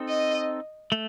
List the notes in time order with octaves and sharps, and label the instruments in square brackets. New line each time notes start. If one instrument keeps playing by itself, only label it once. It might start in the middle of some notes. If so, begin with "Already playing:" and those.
Already playing: [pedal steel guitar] C4 D#4 A4
[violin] D#5
[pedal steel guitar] A3